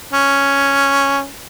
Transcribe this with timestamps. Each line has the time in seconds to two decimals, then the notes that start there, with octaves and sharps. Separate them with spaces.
0.13 C#4